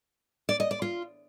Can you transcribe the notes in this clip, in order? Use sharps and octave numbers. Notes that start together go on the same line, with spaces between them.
D5
D#5
D5
F4